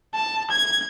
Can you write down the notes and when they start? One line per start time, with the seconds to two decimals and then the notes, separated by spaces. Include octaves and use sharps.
0.14 A5
0.50 G#6